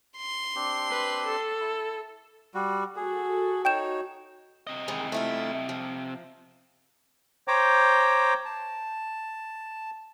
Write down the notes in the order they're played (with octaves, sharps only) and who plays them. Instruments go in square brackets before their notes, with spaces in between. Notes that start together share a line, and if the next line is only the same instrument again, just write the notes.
[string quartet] C6
[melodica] C4 D4 G4
[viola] B4
A4
[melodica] E4
G3 F#4
[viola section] F#4 A4 [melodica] G#4
[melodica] D#4 C#5 [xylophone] G5 G6 E7
[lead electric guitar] C3 D#5
[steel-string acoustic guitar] D#3 E3 G#3
A3 E4 F4
F3
[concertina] C5 C#5 G5 A#5 D6
A5